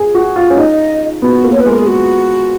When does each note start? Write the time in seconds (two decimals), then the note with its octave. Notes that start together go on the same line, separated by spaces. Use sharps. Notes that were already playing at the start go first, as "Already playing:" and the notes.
Already playing: G#4
0.15 F#4
0.36 F4
0.50 C#4
0.57 D#4 D#5
1.22 B3 F#4
1.44 A#3
1.52 C#5
1.60 B4
1.66 G#3 A#4
1.78 G#4
1.87 F#4